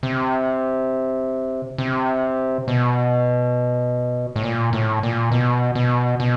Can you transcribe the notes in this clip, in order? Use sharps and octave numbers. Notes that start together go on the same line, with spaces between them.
C3
C3
B2
A2
A#2
A2
A#2
B2
B2
B2